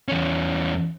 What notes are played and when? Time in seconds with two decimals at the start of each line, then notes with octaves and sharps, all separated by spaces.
0.08 E2 C#4